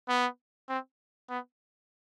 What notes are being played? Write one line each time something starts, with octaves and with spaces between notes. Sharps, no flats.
B3
C4
B3